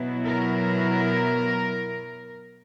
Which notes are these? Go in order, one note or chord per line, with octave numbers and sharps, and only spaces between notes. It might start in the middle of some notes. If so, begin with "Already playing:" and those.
Already playing: B2 F#3 B3 E4
A#4